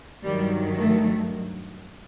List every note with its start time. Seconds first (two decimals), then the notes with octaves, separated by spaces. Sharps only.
0.23 G2 D#3 F#3 G3
0.78 A3